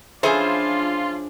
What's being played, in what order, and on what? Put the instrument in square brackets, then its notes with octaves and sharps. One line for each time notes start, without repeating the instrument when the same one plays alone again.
[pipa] E3 C#4 E4 [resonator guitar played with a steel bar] F3 G#4 C5 [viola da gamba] D4 [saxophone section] F4